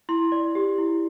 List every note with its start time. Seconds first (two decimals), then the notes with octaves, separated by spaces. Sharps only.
0.09 E4 C6
0.32 D5
0.55 G4
0.78 E4